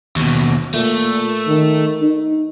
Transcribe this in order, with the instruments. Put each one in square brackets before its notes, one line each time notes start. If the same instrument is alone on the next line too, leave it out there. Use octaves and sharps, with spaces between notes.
[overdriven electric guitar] D#2 B2
[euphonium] A#2 [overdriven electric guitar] A3
[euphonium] D#3
D#4